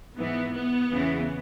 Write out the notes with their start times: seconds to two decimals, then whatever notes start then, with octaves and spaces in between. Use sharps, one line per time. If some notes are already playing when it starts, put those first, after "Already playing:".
0.17 G#2 E3 B3
0.54 B3
0.91 E2 C#3 E3